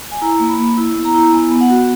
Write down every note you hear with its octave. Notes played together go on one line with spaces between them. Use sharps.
G#5
E4 A#5
A#3
B5
A#3
E4
B3
A#5
E4
B3 G#5
B3
F#5
F#4